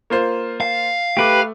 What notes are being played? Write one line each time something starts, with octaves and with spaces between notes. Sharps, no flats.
A#3 F4 C5
F5
A3 G4 B4 D6